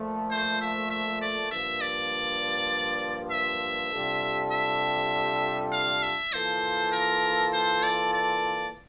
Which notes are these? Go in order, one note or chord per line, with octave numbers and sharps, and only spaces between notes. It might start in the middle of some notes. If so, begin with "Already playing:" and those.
Already playing: A#2 F3 A3
C5
E5
E5
D5
G2 F3 A#3 E5
D5
E5
C3 G3 D4 F4 A4
E5
F5
E5
E3 A#3 F4 A4 C5
A#4
C5
D5
D5